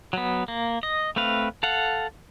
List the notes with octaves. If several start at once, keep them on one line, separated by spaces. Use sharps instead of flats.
F#3 B3
A#3
D#5
A3 C4 B4 F5
A4 F5 F#5